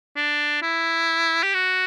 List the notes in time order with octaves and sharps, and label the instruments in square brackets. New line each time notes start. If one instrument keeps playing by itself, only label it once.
[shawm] D4
E4
G4
F#4